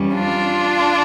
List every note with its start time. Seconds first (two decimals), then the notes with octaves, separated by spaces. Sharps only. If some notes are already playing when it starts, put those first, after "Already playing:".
Already playing: F2 E3 G3 C#4
0.14 D4 F4